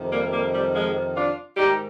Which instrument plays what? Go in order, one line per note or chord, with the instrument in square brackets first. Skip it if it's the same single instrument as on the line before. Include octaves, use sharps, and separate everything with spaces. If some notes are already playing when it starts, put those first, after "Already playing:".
Already playing: [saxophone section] F2 C3 D#3
G3 A#3
G3 A#3
G3
F3 G#3
D4 F4
G#2 D#3 D#4 G4